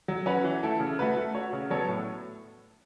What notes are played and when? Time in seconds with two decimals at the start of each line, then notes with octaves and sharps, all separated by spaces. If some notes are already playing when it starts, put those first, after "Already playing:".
0.08 F#3
0.26 C#4 F#4 B4
0.44 E3
0.63 A3 E4 A4
0.80 C#3
0.99 A3 F#4 B4
1.17 A3
1.34 F#4 C#5
1.53 C#3
1.70 F#3 B3 A4 C#5
1.88 A2